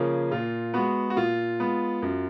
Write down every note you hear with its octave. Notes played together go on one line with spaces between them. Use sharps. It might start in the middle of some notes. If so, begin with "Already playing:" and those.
Already playing: C#3 F3 A#3 C#4 G#4
A#2 F4
G#3 B3 F#4
F#4
A#2 F4
G#3 B3
F#2